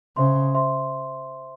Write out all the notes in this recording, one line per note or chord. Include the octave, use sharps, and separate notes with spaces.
C#3 C5 E5 C6
C5 E5 C6